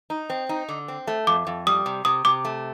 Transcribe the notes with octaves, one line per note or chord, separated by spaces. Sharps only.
D#4
C4
D#4
D3
C4
A3
F2 D6
F2
G3 D#6
C3
C3 D#6
C3 D6
A3